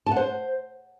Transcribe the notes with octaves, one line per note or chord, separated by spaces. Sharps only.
A5
F#5
C5